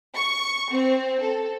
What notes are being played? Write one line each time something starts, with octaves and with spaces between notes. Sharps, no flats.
C#6
C4
A4